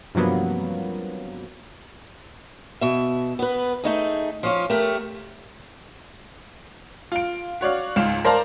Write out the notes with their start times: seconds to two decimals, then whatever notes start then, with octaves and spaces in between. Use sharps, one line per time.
0.15 G2 C3 F3 F#3 A#3 B3
2.81 B2 E5
3.39 B3 B4
3.84 A3 D#4 G#4
4.43 F3 C#4 F4
4.70 A3 G4 A#4
7.12 F4 D7
7.61 F#4 C#5 D5 F5
7.96 C#2 G#2 F5 E7
8.25 A#4 C5 D5 F5 A5 A#5